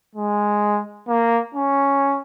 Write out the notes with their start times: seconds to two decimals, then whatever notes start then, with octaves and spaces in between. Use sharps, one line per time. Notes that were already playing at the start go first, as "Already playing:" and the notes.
0.15 G#3
1.08 A#3
1.55 C#4